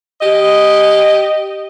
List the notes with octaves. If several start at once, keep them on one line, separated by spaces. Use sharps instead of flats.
G4 D#5